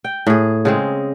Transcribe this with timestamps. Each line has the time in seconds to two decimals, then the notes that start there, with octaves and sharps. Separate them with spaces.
0.04 G5
0.26 A2 G#4
0.65 C#3 G#3 C4